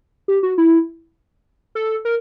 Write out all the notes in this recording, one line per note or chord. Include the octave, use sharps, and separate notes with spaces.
G4
F#4
E4
A4
A#4